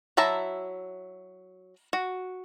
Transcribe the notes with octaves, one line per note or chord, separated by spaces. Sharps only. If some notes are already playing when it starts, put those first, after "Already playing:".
F#3 E4 E5 A5 A#5
F#4